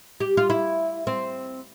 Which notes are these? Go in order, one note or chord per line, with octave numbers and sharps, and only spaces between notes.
G4
F4
E4
C4